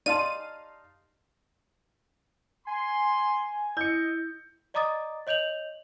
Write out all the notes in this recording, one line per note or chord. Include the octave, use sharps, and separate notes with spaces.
D#4 G4 D5 F5 A5 C6 D#7
G#5 C6
E4 D#5 G6 C#7
D5 D#5 A#5 D6 D#6 A6
C#5 D#5 G6 F7 F#7